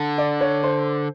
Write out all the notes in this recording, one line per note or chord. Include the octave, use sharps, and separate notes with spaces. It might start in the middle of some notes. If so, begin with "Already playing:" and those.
Already playing: D3
D5
C#5
C5